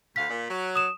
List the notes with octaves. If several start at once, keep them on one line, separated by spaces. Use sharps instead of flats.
D2 F5 B6
A#2
F#3
D#6 E7